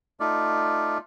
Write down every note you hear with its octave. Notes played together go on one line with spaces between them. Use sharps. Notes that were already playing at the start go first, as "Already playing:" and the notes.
A3 D#4 F4 D5